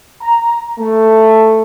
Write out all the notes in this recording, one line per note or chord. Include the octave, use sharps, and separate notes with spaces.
A#5
A3